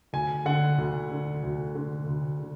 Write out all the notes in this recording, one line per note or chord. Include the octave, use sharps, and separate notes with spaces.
D2 G#5
D3 F#5
D2
D3
D2
D3
D2
D3